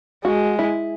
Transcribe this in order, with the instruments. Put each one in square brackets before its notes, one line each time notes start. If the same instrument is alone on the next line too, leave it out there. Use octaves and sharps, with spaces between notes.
[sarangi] G#3 [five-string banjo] F#4
[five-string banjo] E4